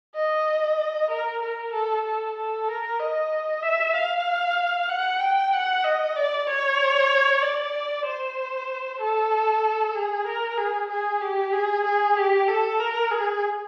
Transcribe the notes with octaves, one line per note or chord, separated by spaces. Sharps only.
D#5
A#4
A#4
A4
A4
A4
A#4
D#5
E5
F5
F#5
G5
F#5
D#5
D5
C#5
D5
C5
A4
G#4
A#4
G#4
G#4
G4
G#4
G#4
G4
A4
A#4
G#4